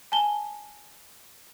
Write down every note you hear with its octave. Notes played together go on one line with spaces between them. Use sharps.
G#5 A5 G7